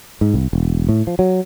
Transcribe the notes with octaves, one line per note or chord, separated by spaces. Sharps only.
G#2
C2
E1
A2
F3
F#3